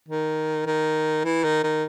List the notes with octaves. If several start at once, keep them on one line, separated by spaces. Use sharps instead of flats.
D#3
D#3
E3
D#3
D#3